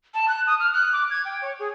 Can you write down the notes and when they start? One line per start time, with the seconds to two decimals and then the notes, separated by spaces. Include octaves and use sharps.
0.14 A5
0.28 F#6
0.47 D#6
0.60 F6
0.73 F#6
0.93 D6
1.10 G#6
1.25 G5
1.42 C#5
1.60 G#4